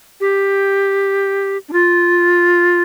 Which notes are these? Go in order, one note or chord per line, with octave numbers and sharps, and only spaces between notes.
G4
D4
F4